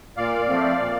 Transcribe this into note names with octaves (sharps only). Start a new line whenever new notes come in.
A#2 D5 F5
F3 A3 C4
A#2